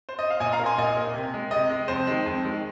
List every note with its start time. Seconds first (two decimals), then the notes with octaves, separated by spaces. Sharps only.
0.09 C5
0.19 D#5
0.30 F5
0.40 A#2 D#5 G#5
0.53 F5 A#5
0.59 A#3
0.66 G#5 C6
0.78 A#2 D#5 G#5
0.96 A#3
1.14 C3
1.34 G#3
1.51 C3 D#5
1.69 G#3
1.88 F2 C5
2.07 D#3 G#3
2.26 F2
2.44 D#3 G#3